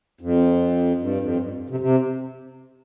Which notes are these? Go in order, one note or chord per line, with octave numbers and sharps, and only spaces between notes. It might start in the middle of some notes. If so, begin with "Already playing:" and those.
F2
G2
F2
G2
C3
C3